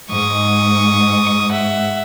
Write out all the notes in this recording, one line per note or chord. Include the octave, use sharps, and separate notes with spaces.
G#2 C#6 D#6
E5 F#5